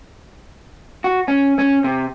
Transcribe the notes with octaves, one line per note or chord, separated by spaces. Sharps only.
F#4
C#4
C#4
C3